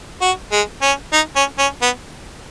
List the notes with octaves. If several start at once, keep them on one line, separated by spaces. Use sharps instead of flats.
F#4
G#3
C#4
D#4
C#4
C#4
B3